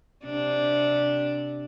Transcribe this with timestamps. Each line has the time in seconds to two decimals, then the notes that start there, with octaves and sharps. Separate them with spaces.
0.25 C3 D4